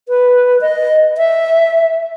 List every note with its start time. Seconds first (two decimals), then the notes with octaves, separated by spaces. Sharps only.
0.09 B4
0.61 D#5
1.17 E5